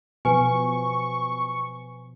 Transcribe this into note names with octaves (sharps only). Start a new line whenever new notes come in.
B2 F3 B4 G#5 C#6